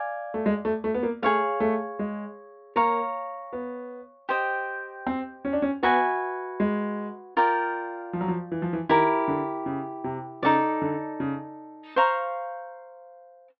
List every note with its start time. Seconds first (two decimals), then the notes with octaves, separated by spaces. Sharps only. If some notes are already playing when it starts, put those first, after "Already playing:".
Already playing: D5 F5 G#5
0.34 A3
0.46 G#3
0.65 A3
0.84 A3
0.94 B3
1.03 A#3
1.22 A3 G#4 C#5 F5
1.60 A3
1.99 G#3
2.76 A#3 C#5 F5 A#5
3.53 B3
4.29 G4 C5 D#5 G5
5.07 C4
5.45 C#4
5.53 D4
5.62 C#4
5.83 B3 F#4 B4 E5 G#5
6.60 G#3
7.37 F4 A#4 D5 G5
8.13 F3
8.21 F#3
8.28 F3
8.51 E3
8.62 F3
8.73 E3
8.89 D#3 E4 G4 A#4
9.28 D3
9.66 C#3
10.04 C3
10.43 C#3 D#4 F#4 A4 D5
10.82 D3
11.20 C#3
11.96 C5 F5 A#5 C#6